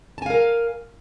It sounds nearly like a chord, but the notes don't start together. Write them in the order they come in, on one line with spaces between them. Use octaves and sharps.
A5 G#5 F5 A#4